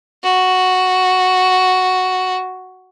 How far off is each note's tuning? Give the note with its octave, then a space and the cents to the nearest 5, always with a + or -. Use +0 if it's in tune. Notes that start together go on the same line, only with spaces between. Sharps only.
F#4 +0